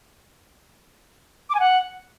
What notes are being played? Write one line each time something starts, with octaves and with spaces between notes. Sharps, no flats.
D6
G#5
F#5